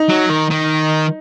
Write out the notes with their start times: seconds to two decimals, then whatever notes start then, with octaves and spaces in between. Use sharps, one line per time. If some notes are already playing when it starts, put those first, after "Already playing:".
Already playing: D#4
0.09 F#3
0.29 D#3
0.50 D#3